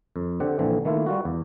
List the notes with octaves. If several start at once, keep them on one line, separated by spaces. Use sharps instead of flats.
F2
D3 C4 G4 F#5
A#1 D3 E3 C4
D#3 A3 A#3 E4 F4
G3 F4 F#4
E2